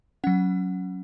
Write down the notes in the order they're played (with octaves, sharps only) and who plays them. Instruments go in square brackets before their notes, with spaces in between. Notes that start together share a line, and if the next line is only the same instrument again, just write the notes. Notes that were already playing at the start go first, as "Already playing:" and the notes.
[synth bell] F#3 C#4 F#5